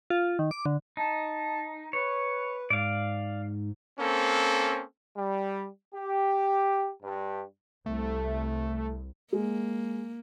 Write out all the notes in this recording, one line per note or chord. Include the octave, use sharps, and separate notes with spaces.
F4
D#3
D6
D3
D#4 A5
B4 C#5
G#2 D5 F5
A#3 C4 C#4 A4
G3
G4
G2
C2 A3
G#3 A#3